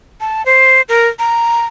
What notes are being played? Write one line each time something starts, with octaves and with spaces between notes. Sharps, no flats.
A5
C5
A#4
A#5